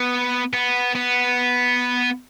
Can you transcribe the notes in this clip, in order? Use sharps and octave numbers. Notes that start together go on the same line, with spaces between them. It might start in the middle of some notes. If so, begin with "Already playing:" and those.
Already playing: B3
B3
B3